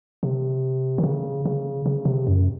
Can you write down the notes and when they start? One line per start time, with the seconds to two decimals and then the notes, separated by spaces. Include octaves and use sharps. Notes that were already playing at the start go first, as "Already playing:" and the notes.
0.23 C3
0.98 D#3
1.04 C#3
1.45 C#3
1.86 C#3
2.05 C3
2.27 F#2